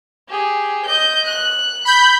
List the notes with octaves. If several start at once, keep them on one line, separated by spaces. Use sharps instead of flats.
G4 G#4
D#5 G6
F#6
B5 G6